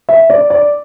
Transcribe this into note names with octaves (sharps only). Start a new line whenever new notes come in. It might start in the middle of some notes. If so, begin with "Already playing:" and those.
E5
D5
D5